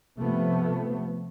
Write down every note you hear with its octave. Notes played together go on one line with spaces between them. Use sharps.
C3 F3 A3 B3